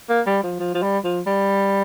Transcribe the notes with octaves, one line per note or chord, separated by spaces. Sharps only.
A#3
G3
F3
F3
F3
G3
F3
G3